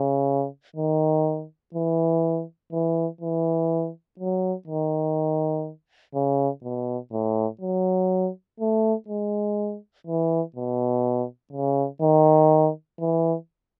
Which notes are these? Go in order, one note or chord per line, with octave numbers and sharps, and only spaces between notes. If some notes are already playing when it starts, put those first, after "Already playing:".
Already playing: C#3
D#3
E3
E3
E3
F#3
D#3
C#3
B2
A2
F#3
A3
G#3
E3
B2
C#3
D#3
E3